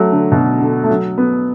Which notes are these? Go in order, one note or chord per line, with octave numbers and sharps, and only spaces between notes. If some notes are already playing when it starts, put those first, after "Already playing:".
Already playing: F#3 A3
D3
B2
D3
A3
F#3
B3